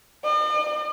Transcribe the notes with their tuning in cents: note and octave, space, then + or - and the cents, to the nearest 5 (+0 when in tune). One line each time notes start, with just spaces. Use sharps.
D#5 -45